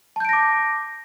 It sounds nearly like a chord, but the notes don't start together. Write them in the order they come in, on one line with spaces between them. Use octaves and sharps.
A5 G6 D7 A#6 D6